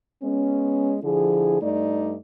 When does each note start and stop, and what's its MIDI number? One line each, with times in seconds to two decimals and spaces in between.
0.23 0.98 56
0.23 0.98 59
0.23 0.98 61
1.03 1.61 50
1.03 1.61 53
1.03 1.61 64
1.03 1.61 68
1.62 2.16 43
1.62 2.16 57
1.62 2.16 63
1.62 2.16 74